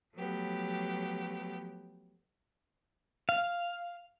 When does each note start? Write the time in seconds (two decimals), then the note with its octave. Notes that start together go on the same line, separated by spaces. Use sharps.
0.15 F3 F#3 A3 B3 G4
3.29 F5